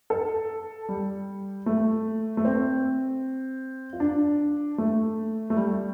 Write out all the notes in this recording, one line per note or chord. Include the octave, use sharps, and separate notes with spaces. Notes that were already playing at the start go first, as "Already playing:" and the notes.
A4
G3
A3
A3
C4
F4
D4
A3
A3
G3